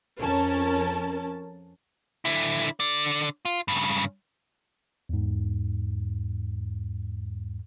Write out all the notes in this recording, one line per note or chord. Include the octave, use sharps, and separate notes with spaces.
F2 C#4 A#4 A5
D3 E4
D3 D5
F4
G2 C#3
E2 G#2